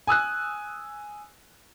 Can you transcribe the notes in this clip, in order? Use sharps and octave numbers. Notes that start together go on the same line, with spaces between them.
G#5 D#6 E6 F#6